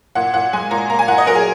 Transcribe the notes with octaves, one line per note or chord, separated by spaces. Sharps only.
A#2 F#5
A#2 F#5
G#3 G#5
A#2 A#5
A#3 A#5
G#5
A#2 F#5
D#5
F#3 A#4
G#4